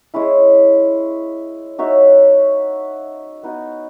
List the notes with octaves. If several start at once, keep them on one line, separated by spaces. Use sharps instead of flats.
G#3 C#4 E4
D#4 F#4 C#5 E5
B3 D#4 F#4